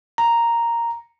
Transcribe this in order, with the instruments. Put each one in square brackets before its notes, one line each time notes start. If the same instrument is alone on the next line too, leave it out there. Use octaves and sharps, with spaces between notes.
[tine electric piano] A#5